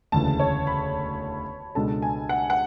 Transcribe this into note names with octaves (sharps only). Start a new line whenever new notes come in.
E1 D2 C#3 E3 A5
C#5
B5
C#2 B2 G#3 D4 A4 A5
G#5
F#5
F#5